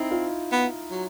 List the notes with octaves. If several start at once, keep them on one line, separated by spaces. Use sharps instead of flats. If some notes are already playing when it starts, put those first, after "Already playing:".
Already playing: C4 D#4 E4
F4
B3
F#3